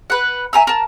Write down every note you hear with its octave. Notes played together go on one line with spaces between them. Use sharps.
B4 F#5
E5 G#5 A#5 E6
A#4 A5